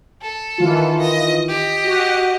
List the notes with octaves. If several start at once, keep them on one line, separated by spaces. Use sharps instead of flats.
A4
D#3 E3 F4
D#5
G4 D#5
F#4